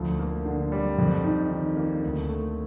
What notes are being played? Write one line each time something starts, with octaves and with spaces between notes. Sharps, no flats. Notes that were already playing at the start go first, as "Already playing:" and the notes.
Already playing: D2 F3
A#3
D3
G3
F2
D#4
D#3
A#3
D2
A3